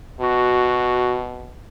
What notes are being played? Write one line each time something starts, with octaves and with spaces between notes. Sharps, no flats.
B2 F#4